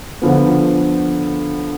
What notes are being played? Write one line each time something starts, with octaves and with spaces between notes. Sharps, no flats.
D3 F3 B3